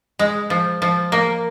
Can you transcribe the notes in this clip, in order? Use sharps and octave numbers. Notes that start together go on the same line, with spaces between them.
G#3
F3
F3
A#3